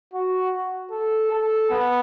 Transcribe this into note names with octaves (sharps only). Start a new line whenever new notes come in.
F#4
A4
A4
B3